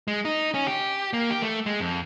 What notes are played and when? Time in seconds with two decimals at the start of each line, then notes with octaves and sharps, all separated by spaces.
0.08 G#3
0.25 D#4
0.54 C#4
0.67 G4
1.13 A#3
1.30 G4
1.42 A3
1.66 G#3
1.80 F2